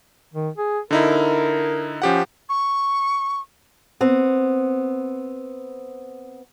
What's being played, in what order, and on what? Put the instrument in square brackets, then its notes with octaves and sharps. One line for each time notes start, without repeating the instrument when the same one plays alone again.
[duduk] D#3
G#4
[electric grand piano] D3 D#4 E4 [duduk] A#4
[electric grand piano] F3 G4 F#5 [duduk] C#4
[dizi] C#6
[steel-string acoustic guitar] B3 C4